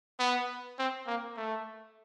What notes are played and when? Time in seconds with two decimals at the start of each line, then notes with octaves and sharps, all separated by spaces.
0.19 B3
0.79 C4
1.07 A#3
1.36 A3